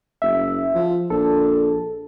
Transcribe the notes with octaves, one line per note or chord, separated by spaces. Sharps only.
F#1 E5
F3
A#1 A4